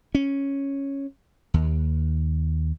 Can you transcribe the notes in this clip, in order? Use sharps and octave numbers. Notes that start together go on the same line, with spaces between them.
C#4
D#2